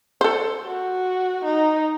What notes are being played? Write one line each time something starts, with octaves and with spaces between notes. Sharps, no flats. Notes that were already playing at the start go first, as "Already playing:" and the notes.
A4 C5
F#4
D#4